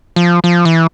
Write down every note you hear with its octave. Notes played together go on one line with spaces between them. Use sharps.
F3
F3
E3